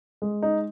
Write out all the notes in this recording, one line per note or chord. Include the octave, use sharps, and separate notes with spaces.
G#3
D#4